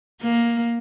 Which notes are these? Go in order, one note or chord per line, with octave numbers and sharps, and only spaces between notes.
A#3